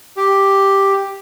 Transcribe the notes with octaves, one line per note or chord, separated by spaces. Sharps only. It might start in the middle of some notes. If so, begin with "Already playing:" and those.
G4